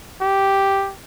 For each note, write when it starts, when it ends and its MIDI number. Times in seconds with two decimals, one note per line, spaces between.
0.21 0.92 67